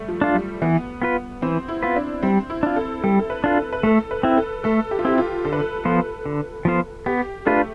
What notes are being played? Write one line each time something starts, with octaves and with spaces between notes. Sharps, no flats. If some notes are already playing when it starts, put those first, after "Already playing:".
Already playing: G3 A3
F3
D4 F4
G3
E3 B3
B3 F4 B4
E3 C4
E4
B3 F4 B4
D4
G3 C4
E4
D4 F4
A4
G3 A4
A4
B4
D4 F4
A4
B4
A3 A4
B4
C4 E4
A4
A3 A4
G4
F4
C4 E4 G4
F4
D3 A4
B4
A4
F3 B3 F4 C5
D3
F3 B3 F4 C5
B3 G4
A3 D4 F4 B4